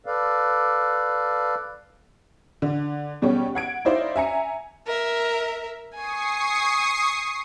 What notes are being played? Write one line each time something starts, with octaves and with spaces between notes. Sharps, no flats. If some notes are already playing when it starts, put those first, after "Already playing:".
A4 B4 D5 F5
D3
B2 G3 B3 C#4 G4
F#5 G#6 D7
D#4 E4 C5 D5 F5
E5 G#5 A#5 C#7
A#4 E5
G#5 C#6 D#6 C7